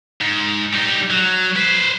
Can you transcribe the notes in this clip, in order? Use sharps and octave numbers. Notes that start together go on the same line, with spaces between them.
G#2
G3 D#4
F#3
B4 C5